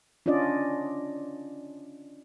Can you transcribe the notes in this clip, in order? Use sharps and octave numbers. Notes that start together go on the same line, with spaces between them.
C#4 D4 F4 D5 D#5